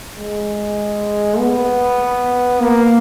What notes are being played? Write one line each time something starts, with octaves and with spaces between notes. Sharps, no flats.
G#3
B3
A#3